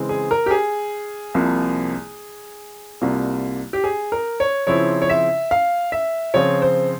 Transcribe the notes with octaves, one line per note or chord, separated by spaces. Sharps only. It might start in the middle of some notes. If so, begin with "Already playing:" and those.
Already playing: C#3 E3 G#3 C4
G#4
A#4
G4
G#4
C2 C3 F3 A#3
C2 C3 G3 A#3 F4
G4
G#4
A#4
C#5
C#3 F3 C4 E4 C#5
C#5
E5
F5
E5
C#3 F3 C4 F4 C#5
C5